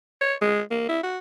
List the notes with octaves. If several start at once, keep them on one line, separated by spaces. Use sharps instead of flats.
C#5
G#3
A#3
E4
F#4